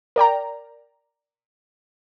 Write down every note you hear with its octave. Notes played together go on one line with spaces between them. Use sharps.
A#4 D5 G5 A#5